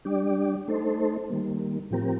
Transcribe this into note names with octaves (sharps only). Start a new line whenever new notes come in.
G3 D4 G4 D5
A3 D#4 A4 C5
D#3 G3 A#3
A2 F3 C4 G4 A#4